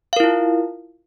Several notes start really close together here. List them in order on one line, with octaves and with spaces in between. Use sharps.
F5 A#4 E4 F4